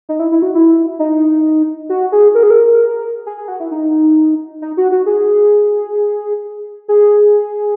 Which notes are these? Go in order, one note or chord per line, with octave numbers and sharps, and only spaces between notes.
D#4
E4
E4
F#4
E4
D#4
F#4
G#4
A#4
G#4
A#4
G#4
G#4
F#4
E4
D#4
D#4
F#4
F#4
G#4
G#4